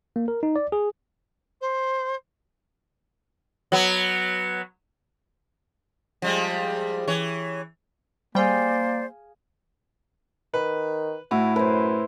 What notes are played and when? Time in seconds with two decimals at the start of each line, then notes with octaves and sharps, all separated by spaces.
0.16 A#3
0.28 A#4
0.43 D#4
0.56 D5
0.72 G#4
1.61 C5
3.72 F#3 B3
6.22 F3 G3 G#3
7.08 E3 C#5
8.35 G3 A#3 G#4 C5 D5 F5 G5 G#5
10.54 D#3 B4
11.31 A2 E4 F#4
11.56 F#2 B4 C5